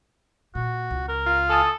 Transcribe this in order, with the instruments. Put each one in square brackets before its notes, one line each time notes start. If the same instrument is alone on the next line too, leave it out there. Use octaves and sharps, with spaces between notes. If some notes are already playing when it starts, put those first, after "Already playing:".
[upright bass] A#2 [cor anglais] F#4
[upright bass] C#2
[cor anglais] A#4
[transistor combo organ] F4
[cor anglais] A4 [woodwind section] G#5 A5 D#6